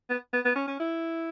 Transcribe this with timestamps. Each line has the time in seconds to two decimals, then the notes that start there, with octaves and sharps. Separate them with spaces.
0.09 B3
0.33 B3
0.45 B3
0.56 C#4
0.67 C#4
0.80 E4